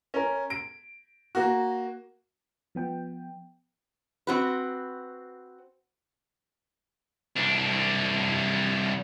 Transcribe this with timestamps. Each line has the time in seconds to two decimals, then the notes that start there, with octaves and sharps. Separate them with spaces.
0.14 C#4 A#4
0.50 D7
1.35 A#3 F#4
2.75 F3 B3 G5
4.27 C4 F#4 B4
7.37 C2 D4